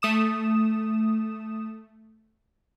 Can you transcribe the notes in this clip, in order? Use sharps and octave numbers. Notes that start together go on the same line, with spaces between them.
A3 D#6 E7